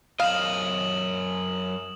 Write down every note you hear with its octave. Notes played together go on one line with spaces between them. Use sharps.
F#2 D#5 F5 D#6 E7 F#7